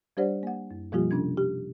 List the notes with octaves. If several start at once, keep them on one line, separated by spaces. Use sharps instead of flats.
G3 D4 G4 C5 D5 F#5
A#3 F#5
F#2
B2 F3 G3 A#3 F4 G4
C3 C#4 D4 G#6
G4